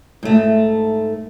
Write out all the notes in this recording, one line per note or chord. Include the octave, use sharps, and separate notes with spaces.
G#2 A3